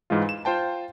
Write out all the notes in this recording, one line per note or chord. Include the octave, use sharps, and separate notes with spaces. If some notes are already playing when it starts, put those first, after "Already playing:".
G#2 E3 G#3 F4
E7
F4 C5 G5 A5